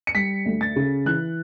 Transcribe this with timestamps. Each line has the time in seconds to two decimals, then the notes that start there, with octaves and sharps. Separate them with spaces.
0.07 C#7
0.15 G3 B6
0.45 D2
0.61 A6
0.76 C#3
1.05 E3 F#6